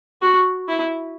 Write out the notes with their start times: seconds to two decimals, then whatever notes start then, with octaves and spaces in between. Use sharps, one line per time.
0.22 F#4
0.68 E4